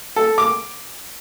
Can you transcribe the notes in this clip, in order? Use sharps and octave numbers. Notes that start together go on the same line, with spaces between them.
A4
D6